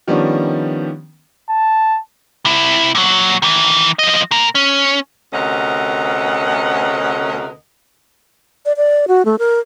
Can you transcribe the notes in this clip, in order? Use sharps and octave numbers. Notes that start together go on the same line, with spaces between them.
D#3 F3 G3 B3 C#4 D4
A5
C3 E4
A#2 F#3
D#3 E3
F3 D#5
A#2 A#4
C#4
D2 C3 C#4 A#4 D#5 F#5
D5
D5
F#4
A3
A#4